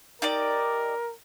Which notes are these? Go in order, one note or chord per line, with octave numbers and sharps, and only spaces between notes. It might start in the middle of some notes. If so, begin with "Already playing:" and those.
D#4 G4 A#4 D5